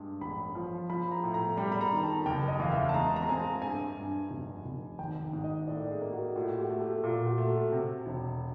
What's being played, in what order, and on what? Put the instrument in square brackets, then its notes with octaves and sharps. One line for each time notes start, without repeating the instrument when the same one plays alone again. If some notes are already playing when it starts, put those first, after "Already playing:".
Already playing: [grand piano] G2 G#3
[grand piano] A1 [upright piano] B5
[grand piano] F3
[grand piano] F3 [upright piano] B5
[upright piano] A#5
[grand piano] A2
[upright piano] A#5
[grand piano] G3 [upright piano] B5
[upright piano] B5
A#5
[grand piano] D#3
[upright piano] A5
[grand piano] F#1 [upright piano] G5
[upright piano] D#5
[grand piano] E2 [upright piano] F5
[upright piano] E5
A5
[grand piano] G#3 [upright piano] A#5
[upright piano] A#5
[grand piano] C4 [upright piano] G#5
[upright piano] A5
[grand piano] G2 [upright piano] G#5
[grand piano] G2
F1
F1
[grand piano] G#1 [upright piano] G5
[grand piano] G#2
[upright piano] D#5
[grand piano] A2 [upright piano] D5
[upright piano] G#4
[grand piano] A#3
[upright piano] F#4
[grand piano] A2 [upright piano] F4
[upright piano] F#4
G4
[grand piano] A3
[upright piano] G4
[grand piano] A#2 [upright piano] F4
[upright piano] F#4
[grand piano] A3
[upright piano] F#4
[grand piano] C3
E1